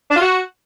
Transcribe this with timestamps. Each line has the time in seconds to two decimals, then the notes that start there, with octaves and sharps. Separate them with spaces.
0.10 D4
0.15 F4
0.20 F#4